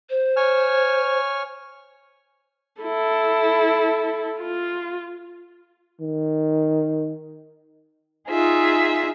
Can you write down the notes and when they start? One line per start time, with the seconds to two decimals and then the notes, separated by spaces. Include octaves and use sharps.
0.10 C5
0.36 C#5 G#5 F6
2.82 E4 A4
4.41 F4
6.00 D#3
8.28 D#4 F4 G#4 E5